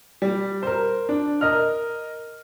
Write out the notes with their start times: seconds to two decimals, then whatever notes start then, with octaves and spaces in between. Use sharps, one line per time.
0.22 G3
0.63 A#4 C5
1.09 D4
1.41 A#4 D#5 F6